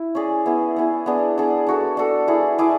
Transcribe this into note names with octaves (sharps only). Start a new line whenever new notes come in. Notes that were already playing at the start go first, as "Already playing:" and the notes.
Already playing: E4
C#4 G#4 D5
B3 E4 G#4
B3 E4 G#4
B3 D4 G#4 D5
B3 D4 G#4 D5
D4 F#4 A4
D4 F#4 A4
E4 G#4 D5
E4 G#4 D5